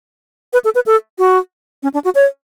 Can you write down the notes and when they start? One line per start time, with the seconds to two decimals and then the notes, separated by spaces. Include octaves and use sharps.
0.53 B4
0.65 A4
0.75 B4
0.86 A4
1.18 F#4
1.83 C#4
1.94 D4
2.04 F#4
2.15 C#5